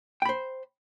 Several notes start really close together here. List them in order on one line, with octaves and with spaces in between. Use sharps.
G5 B5 C5